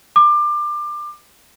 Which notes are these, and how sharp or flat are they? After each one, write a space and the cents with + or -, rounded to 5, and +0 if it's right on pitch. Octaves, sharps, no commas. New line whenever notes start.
D6 +25